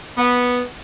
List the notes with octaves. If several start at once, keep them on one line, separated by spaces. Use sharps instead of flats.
B3